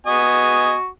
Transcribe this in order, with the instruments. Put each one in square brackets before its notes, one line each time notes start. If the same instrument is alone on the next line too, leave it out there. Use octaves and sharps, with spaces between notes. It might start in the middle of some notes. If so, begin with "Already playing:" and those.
[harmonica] B3 D#5 G#5 [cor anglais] F#4